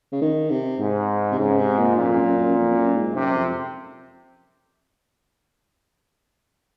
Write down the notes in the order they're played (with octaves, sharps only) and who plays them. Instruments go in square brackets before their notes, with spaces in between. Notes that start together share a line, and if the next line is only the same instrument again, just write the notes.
[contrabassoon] C#3
D#3
C3
[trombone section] G#2
[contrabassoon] C3
[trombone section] G#2 [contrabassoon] C#3
[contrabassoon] C3
A#2
[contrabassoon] F#2 [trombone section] A#2
[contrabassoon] F2
F#2
F#2
F2
F2
F#2
G#2
[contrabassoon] F#2 [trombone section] C3
[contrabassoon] F2